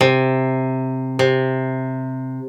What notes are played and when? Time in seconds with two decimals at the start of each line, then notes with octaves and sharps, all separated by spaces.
0.01 C3
1.19 C3